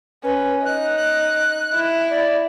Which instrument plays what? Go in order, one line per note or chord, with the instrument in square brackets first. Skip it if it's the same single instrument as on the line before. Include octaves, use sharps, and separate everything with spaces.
[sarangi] C#4 [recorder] B4
[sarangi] D#4 [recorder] F#6
[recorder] F#6
[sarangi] E4
[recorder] D5